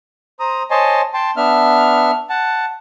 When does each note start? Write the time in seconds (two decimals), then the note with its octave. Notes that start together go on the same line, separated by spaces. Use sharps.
0.40 C5 A#5 D#6
0.71 C5 C#5 D#5 G#5 A5 C6
1.14 G5 A5 C6
1.37 B3 D4 E5 F6
2.30 F#5 A5